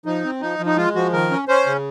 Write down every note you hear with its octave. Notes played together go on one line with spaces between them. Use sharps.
F3 D#4
C4
F3 D#4
F3
D#4
G#3 F4
F3 F#4
D#3 A#4
C#4
C#4 C5
C#3